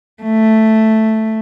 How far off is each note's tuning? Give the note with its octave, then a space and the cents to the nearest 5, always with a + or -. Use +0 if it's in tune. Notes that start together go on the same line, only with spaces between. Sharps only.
A3 +0